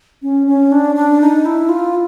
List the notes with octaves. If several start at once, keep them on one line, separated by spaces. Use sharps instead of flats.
C#4
C#4
D4
D4
D#4
E4
F4